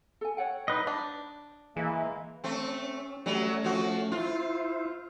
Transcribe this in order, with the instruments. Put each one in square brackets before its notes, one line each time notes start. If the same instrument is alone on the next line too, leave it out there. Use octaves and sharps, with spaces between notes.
[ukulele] A4 G#5
C#5 F#5 G5
[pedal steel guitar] D#4 B4 D#5
[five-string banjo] D4
[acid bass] E3 [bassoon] G#3 [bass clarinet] A#3
[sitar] A3 C4 [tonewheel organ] C#4
[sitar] F#3 G3 [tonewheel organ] A3 C#4
[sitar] F3 F#4
[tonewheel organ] E4 C5 [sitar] F4